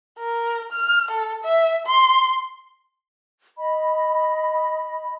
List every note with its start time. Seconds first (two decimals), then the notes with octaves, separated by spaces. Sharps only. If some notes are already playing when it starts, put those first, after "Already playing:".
0.18 A#4
0.72 F6
1.11 A4
1.44 E5
1.87 C6
3.58 D#5 B5